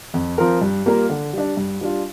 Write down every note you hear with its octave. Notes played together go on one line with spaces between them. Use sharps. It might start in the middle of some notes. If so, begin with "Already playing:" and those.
F2
F3 C4 F4 A#4
G2
G3 A#3 F4 A#4
D3
G3 D4
G2
G3 D4 F4